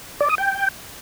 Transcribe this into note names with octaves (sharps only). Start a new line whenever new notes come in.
D5
D#6
G5